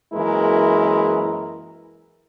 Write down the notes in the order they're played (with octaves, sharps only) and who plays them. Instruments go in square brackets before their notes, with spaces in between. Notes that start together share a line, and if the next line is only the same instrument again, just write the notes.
[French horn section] F#2 E3 G#3 A#3 E4 A#4